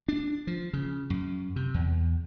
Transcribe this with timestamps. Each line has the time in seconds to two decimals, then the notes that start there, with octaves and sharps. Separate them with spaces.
0.08 D4
0.47 F3
0.73 C#3
1.10 F#2
1.56 C3
1.74 E2